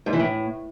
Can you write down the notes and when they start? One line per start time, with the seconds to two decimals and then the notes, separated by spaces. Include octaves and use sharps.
0.06 G#2
0.13 E3
0.20 A2